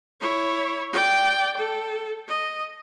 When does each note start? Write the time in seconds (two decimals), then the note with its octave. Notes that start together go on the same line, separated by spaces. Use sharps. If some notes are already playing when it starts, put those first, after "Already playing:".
0.21 E4 C#5
0.93 D5 G5
1.57 A4
2.28 D#5